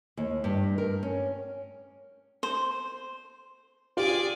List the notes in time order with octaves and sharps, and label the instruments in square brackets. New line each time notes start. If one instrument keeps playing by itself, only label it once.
[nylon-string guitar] D#2
G2
A#4
C#4
[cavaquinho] C5
[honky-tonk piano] F4 G4 [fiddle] G#4 D5